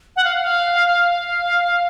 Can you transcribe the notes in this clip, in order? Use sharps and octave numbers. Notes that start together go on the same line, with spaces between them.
F#5
F5
F5
F5